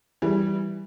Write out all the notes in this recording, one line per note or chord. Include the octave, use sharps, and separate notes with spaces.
E3 G3